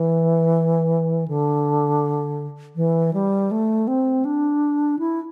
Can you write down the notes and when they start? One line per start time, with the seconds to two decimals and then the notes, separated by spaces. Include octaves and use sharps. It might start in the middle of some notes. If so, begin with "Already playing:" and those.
Already playing: E3
1.28 D3
2.76 E3
3.14 G3
3.51 A3
3.88 C4
4.25 D4
4.99 E4